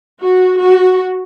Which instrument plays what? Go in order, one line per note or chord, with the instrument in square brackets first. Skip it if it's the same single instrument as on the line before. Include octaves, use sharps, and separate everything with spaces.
[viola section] F#4
F#4